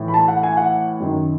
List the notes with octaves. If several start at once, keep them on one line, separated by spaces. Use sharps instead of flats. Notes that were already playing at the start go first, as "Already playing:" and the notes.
Already playing: A2 E3
B5
A5
F#5
G#5
F#5
F#2 D#3